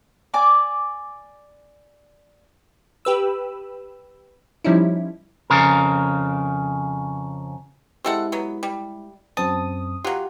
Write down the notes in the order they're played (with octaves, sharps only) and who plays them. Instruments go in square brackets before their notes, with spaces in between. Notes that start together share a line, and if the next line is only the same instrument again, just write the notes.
[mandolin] D5 G#5 D6
[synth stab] G4 B4 E6
F3 G3 C#4 D#4 E4
[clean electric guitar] F2 C#3 A#4
[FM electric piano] G#3 E4 G4 [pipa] C4 A4 F#5
[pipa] F#3 B3
G3
[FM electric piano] F#2 C4 D#6 [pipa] A5
[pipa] F#3 F4 [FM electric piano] G4 F#5